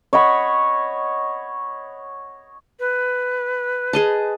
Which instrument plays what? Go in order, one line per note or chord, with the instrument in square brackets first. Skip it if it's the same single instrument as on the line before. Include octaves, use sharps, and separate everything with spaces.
[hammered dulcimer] C#5 D#5 F#5 B5
[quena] B4
[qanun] G#4 D#5 A5